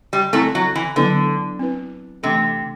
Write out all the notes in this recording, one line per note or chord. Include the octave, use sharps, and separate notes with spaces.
G3
F#3 A3 C4 E4 A4
F#3
E3
D3 F#3 B3 E4 B4
C4 E4 B4
C3 E3 A3 D4 A4